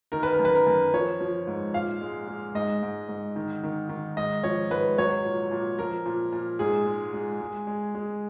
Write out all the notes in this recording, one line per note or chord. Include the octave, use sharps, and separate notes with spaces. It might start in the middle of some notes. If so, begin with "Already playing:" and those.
D#3 A#4
B4
A#4
F#2
B4
A#4
F#2
F3 C#5
F3
G#2
A#2 F5
G#3
G#3
G#2 D#5
G#2
G#2
D#3
D#3
D#3
G#2 D#5
F3 C#5
G#2 B4
F#3 C#5
A#2
A#2
F3 A#4
A#2
A#2
G#2 G#4
G#3
G#3
G#3
G#3
G#3